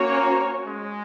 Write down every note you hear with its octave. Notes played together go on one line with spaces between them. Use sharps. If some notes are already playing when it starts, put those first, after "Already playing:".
Already playing: A#3 C#4 F#4 C#5
G#3